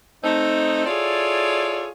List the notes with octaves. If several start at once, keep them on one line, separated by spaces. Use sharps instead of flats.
A3 C4 D#4
E4 F4 G#4 A4 C#5 D5